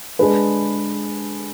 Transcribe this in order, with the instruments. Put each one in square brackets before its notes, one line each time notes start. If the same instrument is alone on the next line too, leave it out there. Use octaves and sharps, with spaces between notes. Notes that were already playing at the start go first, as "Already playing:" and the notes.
[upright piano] G#3 D4 G#4 B4